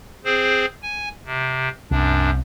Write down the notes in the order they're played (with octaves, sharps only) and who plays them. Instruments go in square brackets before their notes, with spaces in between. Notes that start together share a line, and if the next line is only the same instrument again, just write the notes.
[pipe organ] C4 G#4 C5
G#5
C3
[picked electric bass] C2 [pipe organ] F#2 D4